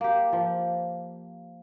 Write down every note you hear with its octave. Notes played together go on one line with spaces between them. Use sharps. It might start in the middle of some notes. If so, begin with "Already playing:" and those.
A#3 G4
F3